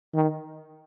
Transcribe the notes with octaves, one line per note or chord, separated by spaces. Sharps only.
D#3